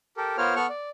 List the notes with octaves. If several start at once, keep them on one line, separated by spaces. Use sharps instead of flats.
G4 A4 A#4
B3 F4 A#4 C5 C#5 F6
B3 A4 F#5 C#6 F6
D5